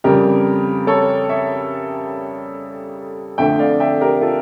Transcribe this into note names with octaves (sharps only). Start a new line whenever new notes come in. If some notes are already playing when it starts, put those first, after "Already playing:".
F2 C#3 G3 G4 A#4
A4 C#5
C#5 E5
F2 D3 A3 E5 G5
D5 F5
E5 G5
G4 A#4
F4 A4